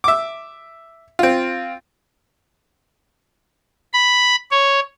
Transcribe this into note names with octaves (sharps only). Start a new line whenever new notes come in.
E5 D6
C4 F4
B5
C#5